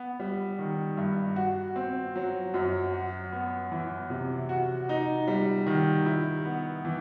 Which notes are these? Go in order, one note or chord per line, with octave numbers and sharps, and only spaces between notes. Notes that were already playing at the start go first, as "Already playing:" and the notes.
Already playing: B3
G3
D#3
G2
F#4
C4
F#3
F#2
F#4
B3
E3
C3
F#4
D#4
G3
D#3
E4
B3
E3